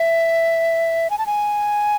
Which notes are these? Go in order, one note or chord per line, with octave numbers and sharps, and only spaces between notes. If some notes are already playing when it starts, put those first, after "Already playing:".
Already playing: E5
G#5
A5
G#5